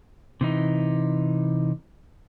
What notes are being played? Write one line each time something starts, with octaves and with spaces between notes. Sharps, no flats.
C3 E3 D#4